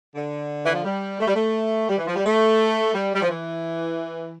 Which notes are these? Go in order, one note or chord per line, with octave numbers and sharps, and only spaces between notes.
D3
E3
F3
G3
A3
G3
A3
G3
E3
F3
G3
A3
G3
G3
F3
E3